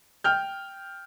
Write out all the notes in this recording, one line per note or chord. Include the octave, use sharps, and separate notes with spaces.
G5 F6 G6